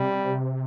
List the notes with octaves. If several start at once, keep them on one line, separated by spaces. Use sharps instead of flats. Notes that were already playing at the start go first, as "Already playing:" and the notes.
Already playing: C3 G3